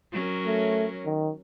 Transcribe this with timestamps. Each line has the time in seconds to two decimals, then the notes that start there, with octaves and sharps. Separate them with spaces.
0.12 F#3 C#4 A#4
0.46 A3
1.05 D#3